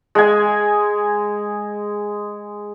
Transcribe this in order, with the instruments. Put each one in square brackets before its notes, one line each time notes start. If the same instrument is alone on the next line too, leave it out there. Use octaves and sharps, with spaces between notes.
[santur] G#3 G#5